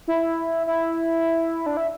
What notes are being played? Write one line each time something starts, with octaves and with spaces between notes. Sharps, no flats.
E4
E4
D4
E4